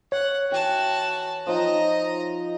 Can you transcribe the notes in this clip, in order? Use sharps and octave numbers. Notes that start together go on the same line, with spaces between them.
C#5 F#5
E3 F#4 G5 A5
F3 D#4 D#5 A#5